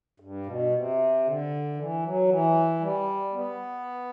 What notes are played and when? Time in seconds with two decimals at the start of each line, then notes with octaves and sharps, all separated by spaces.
0.20 G2
0.46 B2
0.73 C3
1.24 D3
1.76 E3
2.03 F#3
2.28 E3
2.80 G3
3.32 B3